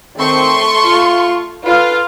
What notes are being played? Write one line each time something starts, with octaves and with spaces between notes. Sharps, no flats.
D#3 A3 C4 C6 C#6
F4
F4 A4 B4 F5